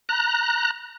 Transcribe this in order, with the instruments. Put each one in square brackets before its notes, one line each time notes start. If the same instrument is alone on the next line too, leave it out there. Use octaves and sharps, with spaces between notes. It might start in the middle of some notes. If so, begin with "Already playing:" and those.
[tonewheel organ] A#5 F#6